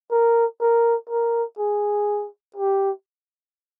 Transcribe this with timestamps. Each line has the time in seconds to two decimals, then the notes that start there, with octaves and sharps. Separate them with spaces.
0.11 A#4
0.61 A#4
1.09 A#4
1.59 G#4
2.57 G4